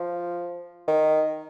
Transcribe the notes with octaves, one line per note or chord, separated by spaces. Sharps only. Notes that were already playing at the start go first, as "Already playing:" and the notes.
Already playing: F3
D#3